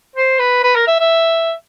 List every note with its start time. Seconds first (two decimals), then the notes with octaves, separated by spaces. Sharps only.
0.16 C5
0.39 B4
0.63 B4
0.75 A#4
0.87 E5
1.00 E5